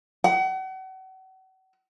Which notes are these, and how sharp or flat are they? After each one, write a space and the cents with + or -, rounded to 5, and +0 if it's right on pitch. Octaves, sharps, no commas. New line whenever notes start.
F#5 +40